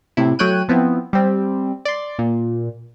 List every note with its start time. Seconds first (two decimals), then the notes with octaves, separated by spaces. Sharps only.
0.17 A2 C3 E4
0.39 F#3 A3 C#5 G5 F#6 D#7
0.68 F3 B3 C4 E4
1.13 G3 C4
1.85 D5 C6
2.19 A#2